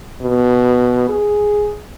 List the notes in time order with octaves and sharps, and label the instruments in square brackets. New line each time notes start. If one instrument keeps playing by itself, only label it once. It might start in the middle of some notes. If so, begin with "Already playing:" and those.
[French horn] B2
G#4